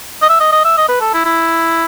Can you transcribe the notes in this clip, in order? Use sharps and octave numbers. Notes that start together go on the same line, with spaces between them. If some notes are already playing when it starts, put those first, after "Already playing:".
D#5
E5
D#5
D#5
E5
D#5
B4
A4
E4
E4